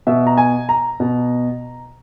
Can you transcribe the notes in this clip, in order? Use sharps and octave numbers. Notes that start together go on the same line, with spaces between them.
B2 E5
A#5
G#5
A#5
B2